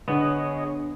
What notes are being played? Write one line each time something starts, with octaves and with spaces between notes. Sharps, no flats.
D3 B3 D4 G#4 C#5 D#5